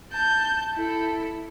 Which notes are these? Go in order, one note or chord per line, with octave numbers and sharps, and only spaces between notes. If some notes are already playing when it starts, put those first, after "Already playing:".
A5 G6
E4 A4